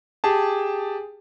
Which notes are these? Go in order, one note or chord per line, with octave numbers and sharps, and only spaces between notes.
G4 G#4 A5